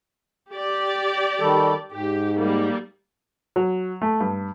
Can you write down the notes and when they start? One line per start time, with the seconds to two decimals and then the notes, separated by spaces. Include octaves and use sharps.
0.53 G4 D5
1.40 D#3 G3 A4
1.92 G#2 G4
2.37 G3 A#3
3.56 F#3
4.02 A3
4.20 G2